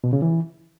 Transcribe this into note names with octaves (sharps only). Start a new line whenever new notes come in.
B2
C#3
E3